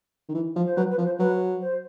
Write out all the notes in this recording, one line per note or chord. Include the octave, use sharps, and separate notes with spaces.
D#3
E3
F3
C5
F#3 B4
B4
F3
C5
F#3 B4
C5